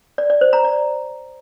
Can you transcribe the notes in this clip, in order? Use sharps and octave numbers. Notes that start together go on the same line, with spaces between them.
D5
D5
C5
A#5
D5